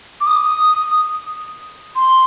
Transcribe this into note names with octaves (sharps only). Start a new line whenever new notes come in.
D6
D#6
C6